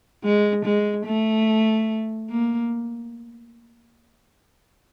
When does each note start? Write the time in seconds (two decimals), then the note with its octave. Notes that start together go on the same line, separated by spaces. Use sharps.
0.24 G#3
0.65 G#3
1.06 A3
2.30 A#3